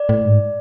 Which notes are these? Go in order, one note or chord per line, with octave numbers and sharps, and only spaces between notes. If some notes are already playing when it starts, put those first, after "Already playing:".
Already playing: D5
A2
G#2